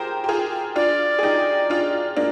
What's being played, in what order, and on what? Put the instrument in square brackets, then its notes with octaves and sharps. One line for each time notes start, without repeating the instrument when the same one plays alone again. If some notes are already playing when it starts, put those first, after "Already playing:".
Already playing: [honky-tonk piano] F4 G4 G#4 A#4 C5
G4
F4 G#4
[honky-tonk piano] D4 F4 [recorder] D5
[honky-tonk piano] G#4
D#4 G4
D4 F4
A#3 D4